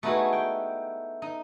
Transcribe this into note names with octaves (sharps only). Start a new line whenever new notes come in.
A3 B3 D#4 E4 F#4 G#4
G5
D#4